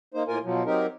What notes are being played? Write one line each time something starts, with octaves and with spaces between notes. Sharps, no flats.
A#3 D#4 C5
A2 A#3 F4 A#4 G#5
B2 F3 F#3
F#3 C4 D#4 G4 A#4